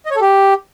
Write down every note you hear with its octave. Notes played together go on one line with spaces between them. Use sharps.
D#5
C#5
A4
G4